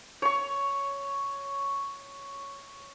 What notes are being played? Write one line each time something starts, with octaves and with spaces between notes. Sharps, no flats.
C#5 C#6